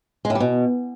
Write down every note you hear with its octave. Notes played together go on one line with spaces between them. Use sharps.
G#3
A2
G3
B2